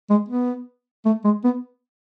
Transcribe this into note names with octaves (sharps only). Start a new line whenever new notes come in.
G#3
B3
A3
G#3
B3